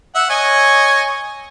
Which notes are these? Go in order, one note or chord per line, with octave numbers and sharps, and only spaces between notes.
E5 F#5
C#5 D#5 G#5